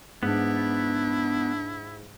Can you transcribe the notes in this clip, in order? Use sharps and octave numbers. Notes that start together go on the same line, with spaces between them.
G#2 B3 D4 E4